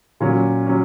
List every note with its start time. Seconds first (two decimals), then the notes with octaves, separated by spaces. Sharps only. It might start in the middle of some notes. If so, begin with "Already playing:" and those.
0.20 A#2 F#3 C#4
0.67 F#3 C#4